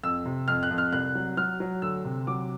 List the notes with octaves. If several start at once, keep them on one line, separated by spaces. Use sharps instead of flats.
F2 E6
C3
F2 F6
F#6
F2
F6
C2 F#6
F#3
F#3 F6
F#3
D2 E6
C3
F#3 D6